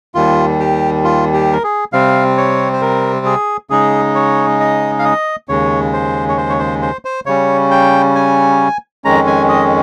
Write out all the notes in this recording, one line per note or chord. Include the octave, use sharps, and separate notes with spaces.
D#2 D#3 G3 F4
G4
F4
G4
A#4
G#4
C3 G3 C4 F5
C#5
C5
A#4
G#4
C#3 G#3 D#4 G#4
C#5
D#5
F5
D#5
D#2 C#3 G#3 C#5
C5
C#5
C5
C#5
C5
C5
C5
C#3 G3 C#4 C#5
G5
G#5
F2 D#3 G#3 C#4 A#5
G#5
D#5